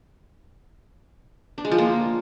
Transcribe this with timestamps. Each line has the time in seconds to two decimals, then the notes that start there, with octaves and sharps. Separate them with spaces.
1.58 D4
1.65 G#3
1.71 F3
1.78 A#3